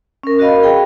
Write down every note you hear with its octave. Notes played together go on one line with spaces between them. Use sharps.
C#4 A#4
F#4 A#4 D#5 F5 B5
G#4 G5